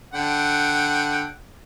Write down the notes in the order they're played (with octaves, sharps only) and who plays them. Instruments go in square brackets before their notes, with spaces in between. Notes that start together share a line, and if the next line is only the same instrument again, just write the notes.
[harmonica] D3 F#5 G5